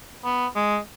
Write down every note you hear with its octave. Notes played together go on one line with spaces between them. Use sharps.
B3
G#3